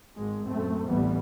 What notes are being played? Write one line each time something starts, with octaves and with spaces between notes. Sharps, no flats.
G#1 G#3
F#2 A#2 A3 C4
A1 D2 E3 G3 B3